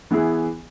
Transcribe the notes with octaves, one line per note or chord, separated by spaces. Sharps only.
E3 B3 E4 G#4